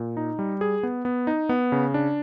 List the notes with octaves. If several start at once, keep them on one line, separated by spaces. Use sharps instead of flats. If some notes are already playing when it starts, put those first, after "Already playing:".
Already playing: A#2
D#4
G3
G#4
B3
B3
D#4
B3
C#3
D4